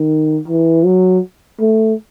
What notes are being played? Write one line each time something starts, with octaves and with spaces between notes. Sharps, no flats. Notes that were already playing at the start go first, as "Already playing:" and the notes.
Already playing: D#3
E3
F#3
A3